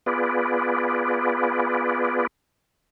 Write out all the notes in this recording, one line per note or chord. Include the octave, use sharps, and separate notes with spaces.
B3 F4 G#4 B4 D5